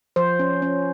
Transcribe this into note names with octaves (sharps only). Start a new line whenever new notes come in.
F3 C5
C#4
C#4